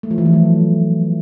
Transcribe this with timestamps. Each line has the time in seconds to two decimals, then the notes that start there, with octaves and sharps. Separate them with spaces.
0.03 A3
0.11 F3
0.18 E3
0.25 A3
0.33 F#3